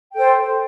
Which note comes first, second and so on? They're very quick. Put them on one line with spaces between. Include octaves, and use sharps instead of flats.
G5 A4 C5